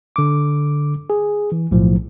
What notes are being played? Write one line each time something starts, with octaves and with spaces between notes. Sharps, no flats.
D3 D6
G#4
E3
B1 A2 F3